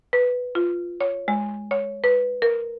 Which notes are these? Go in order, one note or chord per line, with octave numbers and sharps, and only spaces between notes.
B4
F4
C#5
G#3
C#5
B4
A#4